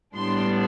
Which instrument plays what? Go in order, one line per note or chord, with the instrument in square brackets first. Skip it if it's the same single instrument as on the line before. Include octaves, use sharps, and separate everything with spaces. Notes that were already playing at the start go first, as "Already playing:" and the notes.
[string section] A2 G3 B3 D4 C6